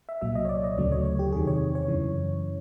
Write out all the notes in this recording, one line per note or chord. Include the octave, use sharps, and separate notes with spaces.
E5
C2 A#2 F#3 E5
D#5
C#5
D5
D#5
D2 C#3 F#3 A3 D5
C#5
C#5
G4
E2 C3 D#3 G#4
C#5
C#5
F#2 C#3 E3